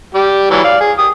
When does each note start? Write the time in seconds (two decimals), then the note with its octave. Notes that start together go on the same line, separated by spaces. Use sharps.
0.15 G3 G4
0.51 E3 F#3 G3
0.64 D5 F5
0.80 G#4
0.99 G4 D#6